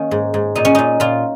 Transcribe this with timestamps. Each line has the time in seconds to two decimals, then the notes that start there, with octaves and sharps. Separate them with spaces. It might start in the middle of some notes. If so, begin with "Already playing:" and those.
Already playing: D#3 A#3 C#4
0.11 G#2
0.34 G#2
0.55 A#2 D#4
0.65 C#4
0.75 A#2 D#4
1.00 A#2 F4